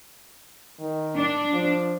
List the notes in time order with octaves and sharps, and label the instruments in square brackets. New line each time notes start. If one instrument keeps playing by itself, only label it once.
[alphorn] D#3
[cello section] D4
[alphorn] F3